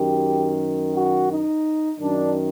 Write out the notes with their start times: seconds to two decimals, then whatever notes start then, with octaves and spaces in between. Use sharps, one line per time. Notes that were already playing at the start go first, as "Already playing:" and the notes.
Already playing: F#2 D#3 G4
0.95 F#4
1.30 D#4
2.00 F#2 D#3 D4